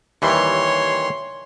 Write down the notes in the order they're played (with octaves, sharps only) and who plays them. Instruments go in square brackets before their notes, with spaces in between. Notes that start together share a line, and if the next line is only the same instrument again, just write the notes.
[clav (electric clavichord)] D#2 E3 G3 [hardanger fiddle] C#5 C6